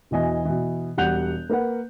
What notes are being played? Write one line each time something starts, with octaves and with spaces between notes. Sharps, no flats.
E1 B2 E3 D#5 G#5
B2 E3
E1 G3 F#5 F#6 G6 F7
A#3 A#4 B4 F#5